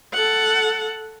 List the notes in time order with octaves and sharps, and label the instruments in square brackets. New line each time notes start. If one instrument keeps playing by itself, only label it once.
[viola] A4 F#5